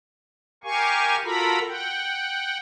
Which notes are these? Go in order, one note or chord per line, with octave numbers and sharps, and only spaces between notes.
G4 A#4 F5 G#5 C#6
F4 F#4 A4 A#4 A#5 B5
F#5 G5